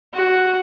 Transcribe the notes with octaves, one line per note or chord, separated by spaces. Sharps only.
F#4